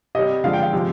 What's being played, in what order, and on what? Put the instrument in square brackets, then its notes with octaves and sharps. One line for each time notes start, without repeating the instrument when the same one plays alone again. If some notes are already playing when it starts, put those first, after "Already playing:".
[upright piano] C3 G3 D#5
D3 F3 G#3 F5
G5
F5
C3 F3 G#3